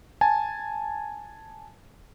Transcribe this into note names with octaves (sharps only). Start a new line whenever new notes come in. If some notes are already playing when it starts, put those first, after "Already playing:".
G#5 A5